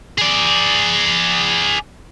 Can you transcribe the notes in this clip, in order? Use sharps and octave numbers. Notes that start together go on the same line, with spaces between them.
G#4 D5